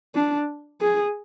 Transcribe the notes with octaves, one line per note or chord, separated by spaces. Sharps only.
D4
G#4